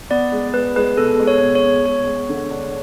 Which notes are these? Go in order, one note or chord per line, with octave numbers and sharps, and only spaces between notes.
B3 D5
G#3
G#3 B4
G#3 B4
B2 A4
G#3
C#5
B2
C#5
B2
G#3 C#5
G#3
D3
D4